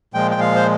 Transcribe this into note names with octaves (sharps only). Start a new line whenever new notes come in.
A#2 F3 G#3 G5
G5
F5
C5